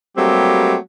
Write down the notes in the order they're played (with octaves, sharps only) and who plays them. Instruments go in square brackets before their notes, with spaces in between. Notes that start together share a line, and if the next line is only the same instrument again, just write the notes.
[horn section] F#3 G3 A3 A#3 C4 G4